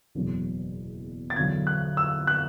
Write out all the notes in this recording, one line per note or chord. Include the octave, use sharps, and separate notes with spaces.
F#1 E2 B2 F#3
A6
E2 D3 F#3 G#6
F#6
E6
F#6